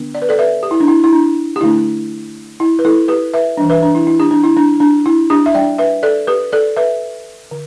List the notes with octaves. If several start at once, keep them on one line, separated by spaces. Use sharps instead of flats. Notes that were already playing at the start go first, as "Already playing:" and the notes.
Already playing: D3 B3 D4
D5
B4
A4 D5
B4 E5
G4
E4
D4
E4
E4
D4
G4
D3 A3 D4 E4
E4
B4
E4 A4
G4 B4
B4 E5
E3 G3 D4
B4 E5
D4
E4
E4
D4 G4
D4
E4
D4
D4
E4
D4 G4
E5
G3 D4 D5 G5
B4 E5
A4 D5
G4 B4
A4 D5
B4 E5
D3